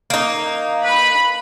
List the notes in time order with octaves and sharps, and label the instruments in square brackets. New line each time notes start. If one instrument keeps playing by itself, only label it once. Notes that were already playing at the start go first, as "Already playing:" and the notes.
[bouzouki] A#3 D#4
[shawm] B4 [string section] B5